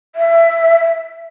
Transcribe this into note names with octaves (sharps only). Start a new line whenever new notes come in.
E5